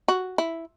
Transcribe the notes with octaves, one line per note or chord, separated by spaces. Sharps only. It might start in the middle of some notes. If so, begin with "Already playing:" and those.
F#4
E4